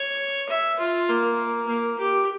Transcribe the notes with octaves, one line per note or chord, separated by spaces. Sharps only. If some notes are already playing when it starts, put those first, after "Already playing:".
Already playing: C#5
E5
F4
A#3
A#3
G4